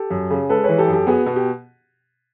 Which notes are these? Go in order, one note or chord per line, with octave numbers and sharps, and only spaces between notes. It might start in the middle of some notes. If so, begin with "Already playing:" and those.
Already playing: G4 A4
F#2
C#3
G#3 A4 B4
E3 B4 C#5
G4 A4
F#2
G4 A4
B3 F#4 G#4
B2
G4